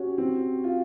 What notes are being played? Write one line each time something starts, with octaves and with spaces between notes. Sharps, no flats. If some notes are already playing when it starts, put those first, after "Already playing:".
Already playing: C#4 F#4 G4
C4
F4